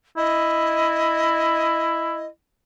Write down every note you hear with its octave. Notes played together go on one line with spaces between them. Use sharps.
E4 D#5